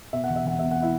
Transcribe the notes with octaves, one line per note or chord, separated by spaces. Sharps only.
B2 E5
F#5
E1
E5
E1 F#5
B2 E5
F#5
E4 E5